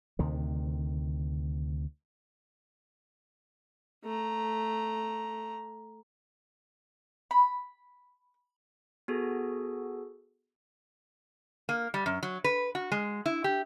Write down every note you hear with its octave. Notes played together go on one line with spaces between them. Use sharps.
D2 C3 D#3
A3 A#5
B5
B3 F#4 G#4 A4
A#3
G3
F#2
F#3
B4
F#4
G#3
E4
G4